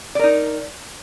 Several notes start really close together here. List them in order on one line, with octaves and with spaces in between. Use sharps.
D5 A#4 D#4